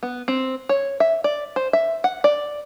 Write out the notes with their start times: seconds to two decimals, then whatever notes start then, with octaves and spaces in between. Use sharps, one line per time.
0.03 B3
0.28 C4
0.69 C#5
1.00 E5
1.24 D5
1.56 C5
1.73 E5
2.04 F#5
2.24 D5